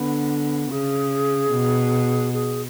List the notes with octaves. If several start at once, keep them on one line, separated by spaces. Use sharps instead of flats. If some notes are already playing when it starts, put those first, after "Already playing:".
Already playing: D3 B3
C#3 G#4
B2
G#4